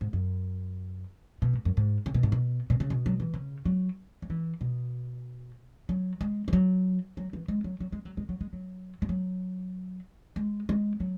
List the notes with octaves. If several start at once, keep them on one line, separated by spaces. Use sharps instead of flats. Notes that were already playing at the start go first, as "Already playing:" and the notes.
G#2
F#2
B2
G#2
F#2
G#2
C#3
B2
G#2
B2
B2
C#3
B2
F#3
E3
C#3
F#3
F#3
E3
B2
F#3
G#3
E3
F#3
F#3
E3
G#3
F#3
F#3
G#3
F#3
G#3
F#3
G#3
F#3
G#3
F#3
G#3
G#3
F#3